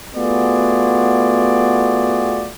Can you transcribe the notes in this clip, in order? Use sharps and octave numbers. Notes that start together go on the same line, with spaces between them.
A3 B3 F4 F#4 G#4 D5